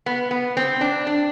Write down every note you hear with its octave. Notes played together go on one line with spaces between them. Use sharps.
B3
B3
C4
D4
D4